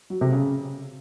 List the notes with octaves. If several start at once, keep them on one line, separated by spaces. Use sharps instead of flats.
F#3
C3
C#3